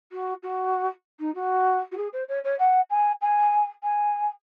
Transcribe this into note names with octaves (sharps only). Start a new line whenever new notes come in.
F#4
F#4
D#4
F#4
F#4
G#4
C5
C#5
C#5
F#5
G#5
G#5
G#5